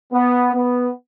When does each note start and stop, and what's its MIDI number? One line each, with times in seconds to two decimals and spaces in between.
0.13 0.52 59
0.54 0.90 59